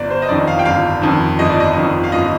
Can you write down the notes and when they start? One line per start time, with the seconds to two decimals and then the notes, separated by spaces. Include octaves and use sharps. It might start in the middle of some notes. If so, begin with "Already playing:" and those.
Already playing: G1 D5
0.10 C5
0.22 D#5
0.29 F2 D#3 D5
0.47 F5
0.59 G5
0.65 G1 F5
1.02 F2 D#3
1.39 G1 D#5
1.50 D5
1.60 D#5
1.76 F2 D#3
2.04 F5
2.12 G1 D#5